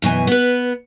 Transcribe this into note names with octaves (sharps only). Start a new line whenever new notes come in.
F#2 B2 E3 G#5
B3 B4